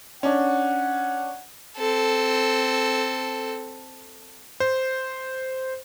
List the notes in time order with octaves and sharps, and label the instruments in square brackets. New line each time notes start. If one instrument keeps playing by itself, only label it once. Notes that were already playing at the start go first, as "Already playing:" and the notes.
[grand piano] C#4 D4 [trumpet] F#5
[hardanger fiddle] C4 A4
[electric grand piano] C5